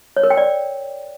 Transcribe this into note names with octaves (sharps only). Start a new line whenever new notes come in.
C#5
A#4
G5
D5